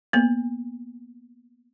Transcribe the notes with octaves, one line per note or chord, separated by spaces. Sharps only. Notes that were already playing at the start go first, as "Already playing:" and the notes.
A#3 B3